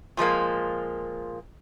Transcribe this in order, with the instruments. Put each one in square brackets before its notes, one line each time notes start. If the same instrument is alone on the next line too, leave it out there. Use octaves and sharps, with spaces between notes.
[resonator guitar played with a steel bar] A#2 F3 G#3 A#3